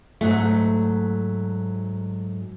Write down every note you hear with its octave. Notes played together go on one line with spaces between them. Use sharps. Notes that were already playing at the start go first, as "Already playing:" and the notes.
G#2 F#3 A3